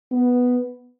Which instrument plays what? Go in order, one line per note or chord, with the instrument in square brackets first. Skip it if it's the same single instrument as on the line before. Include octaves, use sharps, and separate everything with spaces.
[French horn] B3